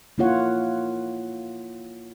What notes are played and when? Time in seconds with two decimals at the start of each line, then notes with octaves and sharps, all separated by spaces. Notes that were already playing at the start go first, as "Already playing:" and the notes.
0.18 A#3 E4 F4 C#5 F#5